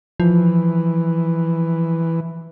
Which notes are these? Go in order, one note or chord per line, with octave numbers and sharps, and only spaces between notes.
E3 F3